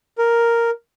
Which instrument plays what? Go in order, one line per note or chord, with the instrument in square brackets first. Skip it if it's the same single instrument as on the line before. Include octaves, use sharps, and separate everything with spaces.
[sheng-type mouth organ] A#4